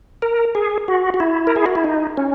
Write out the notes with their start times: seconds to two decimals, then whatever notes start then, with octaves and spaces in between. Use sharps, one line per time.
0.22 A#4
0.55 G#4
0.88 F#4
1.14 F#4
1.20 E4
1.47 A#4
1.56 G#4
1.66 F#4
1.75 E4
1.84 D#4
2.17 C#4